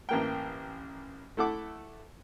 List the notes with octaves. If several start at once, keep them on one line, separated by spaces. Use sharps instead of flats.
A1 A#3 G5
A3 E4 A4 F#5 D6